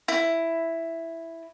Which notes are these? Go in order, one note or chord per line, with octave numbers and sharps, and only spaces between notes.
E4